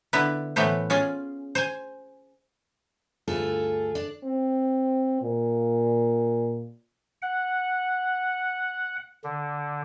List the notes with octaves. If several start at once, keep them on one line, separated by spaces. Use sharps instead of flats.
D3 B3 E4 B4
A2 E3 A3 B3 B4 C5
C#4 F4 G#4
C5 G#5
D2 G2 F4 G#4 A4
D4 D5
C4
A#2
F#5
D3